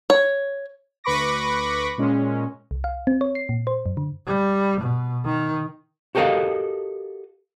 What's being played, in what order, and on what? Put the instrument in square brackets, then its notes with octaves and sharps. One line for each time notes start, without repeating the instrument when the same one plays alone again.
[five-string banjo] C#5
[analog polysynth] D2 B4 B5 C#6 D6 A#6
A#2 G#3 C#4
[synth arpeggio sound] C2
F5
C4
C#5
C7
A#2
C5
F#2
D3
[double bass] G3
B2
D#3
[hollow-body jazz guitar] F#4 G4 A4 A#4 D#5 F5